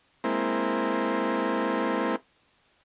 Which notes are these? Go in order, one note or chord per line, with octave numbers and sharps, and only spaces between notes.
G#3 A#3 C4 E4